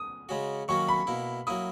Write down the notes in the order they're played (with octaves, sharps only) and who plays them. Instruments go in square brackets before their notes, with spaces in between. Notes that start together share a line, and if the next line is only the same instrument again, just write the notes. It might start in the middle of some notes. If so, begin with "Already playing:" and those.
Already playing: [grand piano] D#6
[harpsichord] C#3 G#3 C#4 F#4
[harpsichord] D#3 F#3 A#3 C#4 F#4 [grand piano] C#6
[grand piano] B5
[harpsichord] B2 A#3 E4
[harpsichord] F#3 A#3 E4 [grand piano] D#6